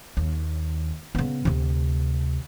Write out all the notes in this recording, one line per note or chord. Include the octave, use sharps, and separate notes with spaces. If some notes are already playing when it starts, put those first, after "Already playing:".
D#2
C#3 B3
D2 C3